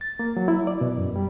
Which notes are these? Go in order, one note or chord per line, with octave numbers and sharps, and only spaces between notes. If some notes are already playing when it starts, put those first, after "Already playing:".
A6
A#3
F#3
E4
D5
B2
F#2
G3